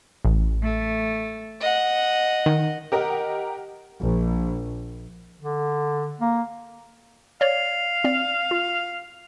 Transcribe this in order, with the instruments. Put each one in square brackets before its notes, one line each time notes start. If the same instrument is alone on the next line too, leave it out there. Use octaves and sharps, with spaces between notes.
[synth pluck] A1
[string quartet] A3
D#5 F#5
[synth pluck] D#3
[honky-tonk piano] G4 A#4 D#5 F#5
[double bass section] A#1
[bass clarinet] D3
A#3
[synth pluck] C#5 D5 [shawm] F5
[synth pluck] C4 D5
F4